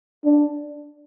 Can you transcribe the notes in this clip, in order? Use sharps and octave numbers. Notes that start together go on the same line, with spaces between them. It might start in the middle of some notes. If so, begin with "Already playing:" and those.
D4